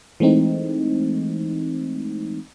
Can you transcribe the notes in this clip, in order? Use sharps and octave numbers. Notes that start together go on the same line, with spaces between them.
E3 G#3 A3 C4 D#4